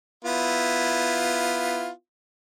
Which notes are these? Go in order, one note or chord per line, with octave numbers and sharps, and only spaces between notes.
B3 E4 F4